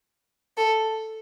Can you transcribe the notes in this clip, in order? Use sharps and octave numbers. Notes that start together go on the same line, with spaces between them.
A4